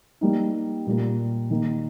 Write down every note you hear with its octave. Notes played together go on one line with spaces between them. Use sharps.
G3 A#3 D#4
A#2 G3 A#3
D#3 A#3 D#4